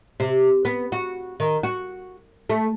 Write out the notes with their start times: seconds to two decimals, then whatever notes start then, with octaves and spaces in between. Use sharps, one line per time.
0.20 C3
0.65 B3
0.92 F#4
1.40 D#3
1.63 F#4
2.49 A3